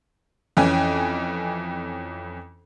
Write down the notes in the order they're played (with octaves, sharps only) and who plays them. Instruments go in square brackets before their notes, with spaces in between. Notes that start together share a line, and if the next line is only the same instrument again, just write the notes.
[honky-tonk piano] F2 E3 C#4 G5 G#5